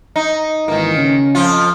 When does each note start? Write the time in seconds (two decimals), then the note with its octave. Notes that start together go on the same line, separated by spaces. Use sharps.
0.16 D#4
0.68 G#1 D#3 E3 A#3
0.97 C#3 C#4
1.35 F2 F3 F4